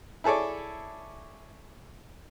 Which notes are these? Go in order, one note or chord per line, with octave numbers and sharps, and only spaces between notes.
E4 G#4 A4 C#5 D5